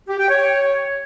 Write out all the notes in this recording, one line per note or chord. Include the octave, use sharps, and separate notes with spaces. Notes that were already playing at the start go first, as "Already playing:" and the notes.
G4
G5
C#5